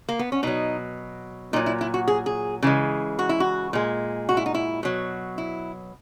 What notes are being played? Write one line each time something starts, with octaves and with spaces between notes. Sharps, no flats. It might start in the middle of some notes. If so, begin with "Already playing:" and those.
A#3
B3
C#4
B2 F#3 D#4
A#2 F#3 D#4
E4
E4
F#4
G#4
G#4
C#3 E3 G#3
F#4
E4
F#4
A#2 G#3
F#4
E4
D#4
E4
B2 F#3
E4